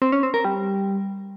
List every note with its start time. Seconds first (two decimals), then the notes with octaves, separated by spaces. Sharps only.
0.02 C4
0.12 C#4
0.23 C4
0.34 A#4
0.45 G3